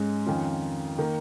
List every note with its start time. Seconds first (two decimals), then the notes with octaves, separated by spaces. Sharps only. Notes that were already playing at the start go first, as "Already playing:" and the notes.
Already playing: G#2 G#3 C#4 G#4
0.26 F2 D#3 C#4 F4
0.99 D#3 A#3